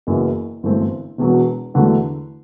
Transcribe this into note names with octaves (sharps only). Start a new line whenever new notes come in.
F#1 F#2 E3 B3
G1 F#2 E3 A3 C4
E1 E2 B2 F#3
E2 D3 F#3 A3 E4